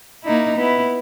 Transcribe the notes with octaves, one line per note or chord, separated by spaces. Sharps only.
A#3 D#4 E4
B3 E4